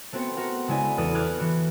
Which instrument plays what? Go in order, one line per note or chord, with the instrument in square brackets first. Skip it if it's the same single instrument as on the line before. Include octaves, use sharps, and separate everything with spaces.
[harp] A3 B3 C4 F#4
F#4 A#4 F#5
C#3 G#3 A3 E4 D5 G#5
E2 A4 B4 D#6
D6 F6 F#6 G#6
E3 F#4